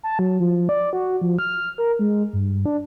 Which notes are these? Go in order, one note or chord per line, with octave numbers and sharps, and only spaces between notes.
A5
F#3
F3
D5
F#4
F3
F6
A#4
G#3
G2
D4